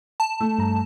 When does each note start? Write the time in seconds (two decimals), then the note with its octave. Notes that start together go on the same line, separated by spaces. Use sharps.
0.20 A5
0.40 A3
0.59 G2 A#5